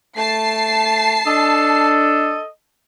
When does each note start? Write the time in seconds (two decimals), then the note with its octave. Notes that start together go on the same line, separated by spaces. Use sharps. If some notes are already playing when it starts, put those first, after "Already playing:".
0.17 A3 A5 C7
1.27 D4 A4 D#5